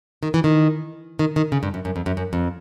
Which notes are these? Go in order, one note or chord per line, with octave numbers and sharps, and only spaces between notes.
D#3
E3
D#3
D#3
D#3
C#3
G2
F#2
F#2
F2
F#2
F#2
F2